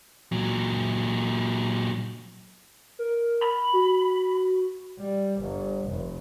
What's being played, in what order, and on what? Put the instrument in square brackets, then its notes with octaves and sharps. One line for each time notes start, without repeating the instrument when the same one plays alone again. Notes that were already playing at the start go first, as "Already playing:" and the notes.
[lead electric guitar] A#2 F#3
[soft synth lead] A#4
[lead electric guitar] B5
[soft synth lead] F#4
[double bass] G3
G1
F1